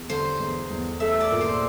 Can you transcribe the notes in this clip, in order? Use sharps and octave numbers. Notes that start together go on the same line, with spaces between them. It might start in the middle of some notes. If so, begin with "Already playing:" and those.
Already playing: E2
D3 C5
E2
E2
A3 E5
D5
A#2
C5